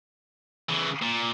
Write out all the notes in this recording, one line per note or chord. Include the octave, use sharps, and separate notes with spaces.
C#3 E3
A#2